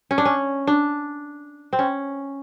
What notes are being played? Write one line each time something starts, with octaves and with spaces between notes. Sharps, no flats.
C#4
D4
C#4
D4
C4
C#4